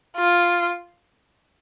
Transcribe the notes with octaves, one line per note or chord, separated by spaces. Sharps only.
F4